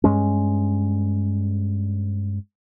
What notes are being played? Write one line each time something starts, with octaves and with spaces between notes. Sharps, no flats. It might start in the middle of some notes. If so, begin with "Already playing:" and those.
G2 G#3 C#4